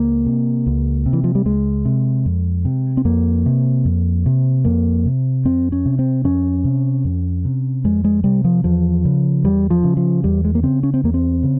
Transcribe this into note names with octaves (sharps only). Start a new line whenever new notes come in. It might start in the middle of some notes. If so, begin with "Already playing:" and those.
Already playing: C#2 A#3
C3
C#2
C3
E3
F3
G3
C#2 G#3
C3
F2
C3
C4
F2 A#3
C3
F2
C3
F2 A#3
C3
F2 C4
C#4
C3
C4
F2 C#4
C3
F2
C3
F2 G#3
G#3
C3 G3
F3
E2 F3
C#3
E2 G3
F3
C#3
F3
E2 G3
G#3
A#3
C#3 C4
C#4
C4
E2 A#3
C4
C#3